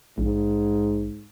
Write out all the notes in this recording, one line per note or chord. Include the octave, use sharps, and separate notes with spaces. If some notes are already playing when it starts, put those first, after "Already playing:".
A#1 G#2